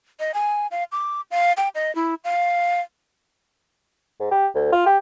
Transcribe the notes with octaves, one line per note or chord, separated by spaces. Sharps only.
D#5
G#5
F5
D6
F5
G5
D#5
E4
F5
G#2
G4
D2
F4
G4